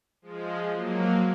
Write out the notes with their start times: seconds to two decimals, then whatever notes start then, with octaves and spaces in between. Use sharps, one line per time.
0.22 F3 G#3
0.74 F#3 A#3